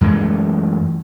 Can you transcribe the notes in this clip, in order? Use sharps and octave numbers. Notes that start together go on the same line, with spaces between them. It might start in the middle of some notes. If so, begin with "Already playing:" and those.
F#2 E3 G#3 A3